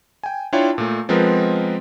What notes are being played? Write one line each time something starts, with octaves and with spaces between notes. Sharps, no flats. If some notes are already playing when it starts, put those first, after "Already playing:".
G5 G#5
D4 E4 F4 C#5 F5 G5
A#2 A3
F3 G#3 B3 C4 A#4 B4